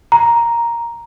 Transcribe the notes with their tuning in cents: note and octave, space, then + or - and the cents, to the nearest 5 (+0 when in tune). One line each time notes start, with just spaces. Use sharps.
A#5 +5